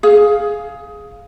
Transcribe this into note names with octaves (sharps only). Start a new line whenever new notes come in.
G#4 F5